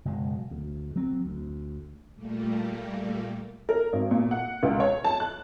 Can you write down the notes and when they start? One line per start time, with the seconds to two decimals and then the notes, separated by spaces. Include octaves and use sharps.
0.05 F#1 B2 G#3
0.51 D2
0.96 F#3 C4
1.25 D2
2.15 A#2 G3 A3 A#3
3.69 A#4
3.93 G#1
4.11 A#2
4.31 F#5
4.63 C#2
4.80 C#5
5.04 A5
5.20 F#6